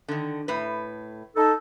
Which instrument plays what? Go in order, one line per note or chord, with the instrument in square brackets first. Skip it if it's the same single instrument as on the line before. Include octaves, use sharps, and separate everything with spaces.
[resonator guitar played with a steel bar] D3 D#3
A2 B4
[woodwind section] D#4 A4